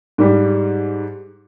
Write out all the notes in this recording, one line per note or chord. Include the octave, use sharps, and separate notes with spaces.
G#2 G3 G4